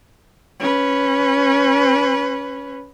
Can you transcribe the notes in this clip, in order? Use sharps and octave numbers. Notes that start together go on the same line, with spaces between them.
C#4 B4